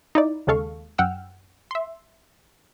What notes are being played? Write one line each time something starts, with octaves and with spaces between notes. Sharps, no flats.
D#4 E4 D5
D#2 C#3 G#3 A4 F5 C#6
F#2 F#5 G5 E6 F6
E5 C6